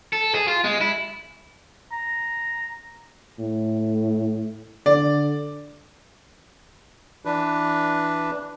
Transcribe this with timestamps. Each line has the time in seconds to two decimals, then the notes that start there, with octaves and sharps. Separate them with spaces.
0.13 A4
0.34 G#4
0.48 F4
0.64 G#3
0.81 E4
1.92 A#5
3.39 A2
4.86 D3 D5
7.25 E3 D4 B4